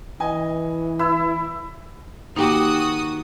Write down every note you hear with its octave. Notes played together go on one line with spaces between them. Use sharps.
E3 D#5 G#5
E4 E6
D#3 A#3 D#4 F#4 G4 D#6